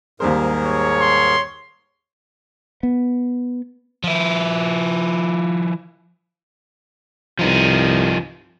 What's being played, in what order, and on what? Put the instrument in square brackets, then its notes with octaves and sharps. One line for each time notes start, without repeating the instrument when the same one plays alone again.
[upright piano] D#2 G3 C5 [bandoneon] G#2 G#4 A#4
[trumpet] C#5
[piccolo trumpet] C6
[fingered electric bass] B3
[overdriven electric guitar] F3 E4
[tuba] C2 [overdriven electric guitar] F3 D#4